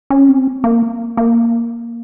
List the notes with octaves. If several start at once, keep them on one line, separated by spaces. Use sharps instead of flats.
C#4
C4
A#3
A#3